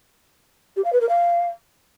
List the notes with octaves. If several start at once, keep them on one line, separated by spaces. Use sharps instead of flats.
G4
F5
B4
A#4
F5